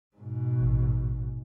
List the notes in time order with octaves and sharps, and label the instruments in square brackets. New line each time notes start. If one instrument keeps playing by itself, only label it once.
[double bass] G#2 B2
[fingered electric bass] A1